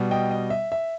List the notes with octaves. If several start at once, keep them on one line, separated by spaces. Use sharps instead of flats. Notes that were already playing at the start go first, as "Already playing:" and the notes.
Already playing: B2 G3
D#5 G5
D#5
E5
E5